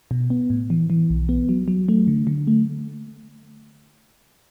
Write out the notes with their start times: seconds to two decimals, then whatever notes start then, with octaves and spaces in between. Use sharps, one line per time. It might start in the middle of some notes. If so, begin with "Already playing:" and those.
0.11 B2
0.30 B3
0.50 A2
0.70 E3
0.90 E3
1.10 B1
1.29 B3
1.49 F#3
1.68 F#3
1.89 A3
2.07 D3
2.27 D3
2.47 A3